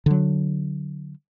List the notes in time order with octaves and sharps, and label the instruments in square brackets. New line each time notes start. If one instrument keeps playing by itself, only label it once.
[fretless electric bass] D3 F#3